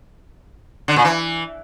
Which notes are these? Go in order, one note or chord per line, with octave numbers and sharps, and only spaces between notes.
D3
A#2
E3